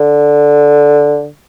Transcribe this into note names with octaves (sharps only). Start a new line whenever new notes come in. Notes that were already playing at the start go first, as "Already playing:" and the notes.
Already playing: D3